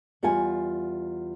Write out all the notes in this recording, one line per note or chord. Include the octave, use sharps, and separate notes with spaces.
E2 G3 F4 F#5 G#5